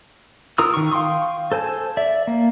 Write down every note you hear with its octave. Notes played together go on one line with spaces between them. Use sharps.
F4 A#4 A#5 D#6 E6
D#3 C#6
F5 G5 C6 C#6 D#6
A4 C5 G#5 A5
D5 E5
A#3